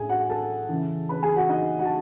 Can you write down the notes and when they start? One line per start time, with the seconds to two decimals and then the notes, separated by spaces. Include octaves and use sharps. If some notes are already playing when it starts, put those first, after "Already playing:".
Already playing: A2 G#4 G#5
0.09 F#4 F#5
0.29 A4 A5
0.69 C#3 E3
1.09 B4 B5
1.23 G#4 G#5
1.36 F#4 F#5
1.49 D#4 D#5
1.79 F#4 F#5
1.85 A5